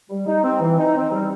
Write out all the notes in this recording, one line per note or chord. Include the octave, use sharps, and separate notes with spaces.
G3
D#4
C4
E3
D#4
C4
G3